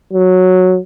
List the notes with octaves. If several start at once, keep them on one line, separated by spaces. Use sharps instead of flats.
F#3